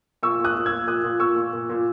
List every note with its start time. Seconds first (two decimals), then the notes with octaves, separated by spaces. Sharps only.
0.23 A#2 C#6 E6
0.39 A#2
0.45 D#6 F#6
0.56 A#2
0.66 E6 G#6
0.72 A#2
0.87 A#2 D#6 F#6
1.04 A#2
1.20 A#2 C#6 E6
1.36 A#2
1.53 A#2
1.70 A#2